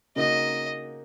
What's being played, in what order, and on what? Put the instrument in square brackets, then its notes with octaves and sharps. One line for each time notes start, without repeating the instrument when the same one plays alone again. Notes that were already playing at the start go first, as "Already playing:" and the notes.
[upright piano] C#3 A#3 D#4 F#4 [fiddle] D#5